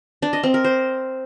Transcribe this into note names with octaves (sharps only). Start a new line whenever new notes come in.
D4
D#5
C4
A#4
C5